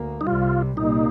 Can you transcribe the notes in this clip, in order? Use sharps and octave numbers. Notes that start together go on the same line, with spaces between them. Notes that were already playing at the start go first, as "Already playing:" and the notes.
Already playing: D2 A#3
D#4
C2 C3 G3 F4
C2 A#2 G3 A#3 D#4